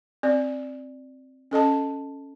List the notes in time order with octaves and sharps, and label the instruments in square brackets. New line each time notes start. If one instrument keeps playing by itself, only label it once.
[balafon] C4 D5
C#4 A4 D#5 A5